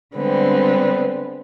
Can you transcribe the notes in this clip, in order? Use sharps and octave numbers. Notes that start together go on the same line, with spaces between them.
D3 G3 G#3 B3 C4